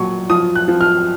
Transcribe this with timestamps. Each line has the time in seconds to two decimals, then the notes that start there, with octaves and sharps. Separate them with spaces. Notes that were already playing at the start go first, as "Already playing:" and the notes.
Already playing: A#2 F#3 C#6
0.29 F3 D#6
0.55 F#6
0.68 F3
0.81 F6